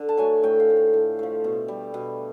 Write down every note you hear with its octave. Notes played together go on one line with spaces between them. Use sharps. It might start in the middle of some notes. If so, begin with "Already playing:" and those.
Already playing: D3
A5
F#3 A3 G#5
A2 G5
F5
F3 A3
F5
A2
F3 A3
B2
G3
B2